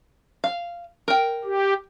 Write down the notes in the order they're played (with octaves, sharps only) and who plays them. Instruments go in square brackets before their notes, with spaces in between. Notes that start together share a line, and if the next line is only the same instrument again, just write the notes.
[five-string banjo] F5
A#4 G5
[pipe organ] G4